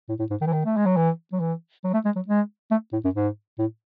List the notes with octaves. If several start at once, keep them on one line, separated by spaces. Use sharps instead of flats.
A2
A2
G#2
D#3
E3
D#3
A3
G#3
F#3
E3
F#3
E3
F#3
A3
G#3
F#3
G#3
A3
A2
F#2
G#2
A2